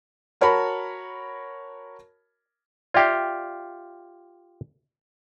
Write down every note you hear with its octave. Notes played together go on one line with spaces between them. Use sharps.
F#4 A#4 C#5 A5 B5
F4 G4 D5 E5 F5 G5